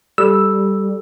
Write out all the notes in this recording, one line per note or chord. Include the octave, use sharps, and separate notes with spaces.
G3 A4 E6